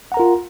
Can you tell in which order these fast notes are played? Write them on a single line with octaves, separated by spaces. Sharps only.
F#5 A#5 A#4 F4